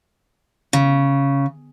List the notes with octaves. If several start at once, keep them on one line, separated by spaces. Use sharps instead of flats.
C#3